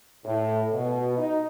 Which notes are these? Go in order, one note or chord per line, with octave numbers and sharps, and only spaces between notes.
A2
B2
D#4